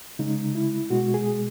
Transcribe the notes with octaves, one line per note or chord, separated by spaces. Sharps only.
C#3 G#3 D#4
E4
B2 G#3 F#4
G#4